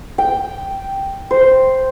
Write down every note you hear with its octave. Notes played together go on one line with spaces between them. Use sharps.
G5
C5